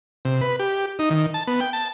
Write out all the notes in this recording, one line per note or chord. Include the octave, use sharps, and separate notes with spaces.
C3
B4
G4
D#4
D#3
A5
B3
G5
A5